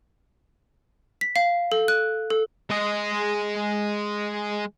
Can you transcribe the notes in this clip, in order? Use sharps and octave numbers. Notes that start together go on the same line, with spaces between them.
B6
F5
A4
F#6
A4
G#3 D#5